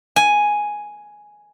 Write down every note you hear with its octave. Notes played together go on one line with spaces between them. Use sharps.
G#5